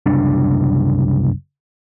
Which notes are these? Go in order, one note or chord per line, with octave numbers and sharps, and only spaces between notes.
F#1 C2 D4